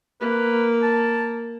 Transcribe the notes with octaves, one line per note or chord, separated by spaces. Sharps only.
A#3 B4
A5